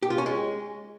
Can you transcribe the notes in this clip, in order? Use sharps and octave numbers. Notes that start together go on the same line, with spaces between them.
G4
F4
C#4
G#3